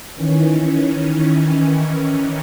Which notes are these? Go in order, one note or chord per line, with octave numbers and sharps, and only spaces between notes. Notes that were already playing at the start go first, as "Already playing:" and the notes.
D#3 E3 C#4